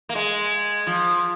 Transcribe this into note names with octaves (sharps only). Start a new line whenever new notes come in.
A#3
G#3
F3